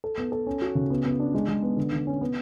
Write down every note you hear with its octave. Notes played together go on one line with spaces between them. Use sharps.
A4
B3
A4
C#4
F#4
C#3
B3
B3
D4
G#3
G#3
B3
D3
D3
C#4
B3